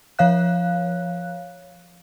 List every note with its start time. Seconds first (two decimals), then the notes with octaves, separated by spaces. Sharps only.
0.19 F3 C#5 F5 F#6